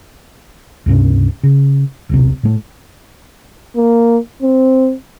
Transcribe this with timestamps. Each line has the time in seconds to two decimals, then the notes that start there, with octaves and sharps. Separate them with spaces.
0.86 C#2 G2 C3 C#4
1.43 C#3
2.09 D#1 B1 C3
2.43 A2 A3
3.77 A#3
4.43 C4